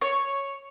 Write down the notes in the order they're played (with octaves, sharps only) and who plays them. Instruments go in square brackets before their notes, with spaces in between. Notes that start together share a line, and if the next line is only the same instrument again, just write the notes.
[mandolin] C#5